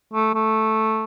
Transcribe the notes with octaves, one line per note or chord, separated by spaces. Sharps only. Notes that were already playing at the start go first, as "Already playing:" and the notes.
A3
A3